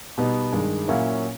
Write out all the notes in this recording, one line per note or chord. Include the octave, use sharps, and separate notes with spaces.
B2 G3 B3 D#4
G2 D#3 G#3
A#2 F#3 A#3 C#4 E4